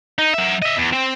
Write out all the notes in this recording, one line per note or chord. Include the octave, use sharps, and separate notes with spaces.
D#4
F#3 E5
D#5 E5
E2
C4 C5